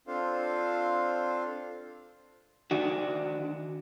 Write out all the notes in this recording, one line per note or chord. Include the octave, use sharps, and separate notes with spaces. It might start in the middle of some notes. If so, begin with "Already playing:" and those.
C4 D4 F4 A4 C5 F5
D#3 D4 F#4